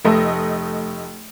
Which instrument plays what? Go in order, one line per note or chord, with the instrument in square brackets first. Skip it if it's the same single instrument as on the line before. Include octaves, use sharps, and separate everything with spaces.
[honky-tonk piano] F1 A3 D#5